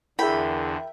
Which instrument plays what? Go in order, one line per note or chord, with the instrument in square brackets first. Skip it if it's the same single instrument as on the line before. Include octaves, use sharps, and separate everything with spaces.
[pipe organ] E2 D3 [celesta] E4 G#4 [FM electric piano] A#4 E5 [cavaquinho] G5 B5